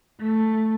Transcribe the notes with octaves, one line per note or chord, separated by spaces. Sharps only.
A3